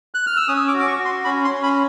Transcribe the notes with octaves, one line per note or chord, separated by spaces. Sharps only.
F#6
F6
E6
C#4 D#6
D6
F#4
D6
C#6
F#4
C6
C#4 B5
C6
C#4
B5